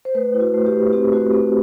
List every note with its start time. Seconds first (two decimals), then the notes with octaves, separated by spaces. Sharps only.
0.05 C5
0.15 A3 B4
0.34 E4
0.41 F#4
0.54 A3
0.66 G4
0.73 A3
0.93 C4 G4
1.13 A3 F#4
1.33 C4 G4